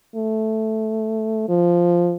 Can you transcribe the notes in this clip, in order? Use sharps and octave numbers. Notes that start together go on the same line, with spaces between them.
A3
F3